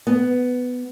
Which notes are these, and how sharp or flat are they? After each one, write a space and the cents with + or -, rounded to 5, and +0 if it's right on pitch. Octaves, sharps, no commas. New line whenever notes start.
B3 +10